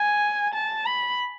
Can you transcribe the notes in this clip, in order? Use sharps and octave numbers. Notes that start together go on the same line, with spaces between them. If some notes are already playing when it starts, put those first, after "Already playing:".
Already playing: G#5
A5
B5